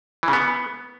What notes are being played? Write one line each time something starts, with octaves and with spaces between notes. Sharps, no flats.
E3
C#3
B3